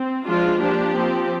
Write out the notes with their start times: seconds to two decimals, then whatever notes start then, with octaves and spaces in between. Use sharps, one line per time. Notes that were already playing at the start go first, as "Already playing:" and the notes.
Already playing: C4
0.25 F3 G#3 D4 F4
0.60 F3 A#3 D4 G4
0.94 F3 C4